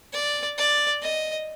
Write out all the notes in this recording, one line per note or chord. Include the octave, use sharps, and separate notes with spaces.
D5
D5
D#5